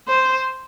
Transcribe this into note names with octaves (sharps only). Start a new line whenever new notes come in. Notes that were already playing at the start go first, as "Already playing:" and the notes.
C5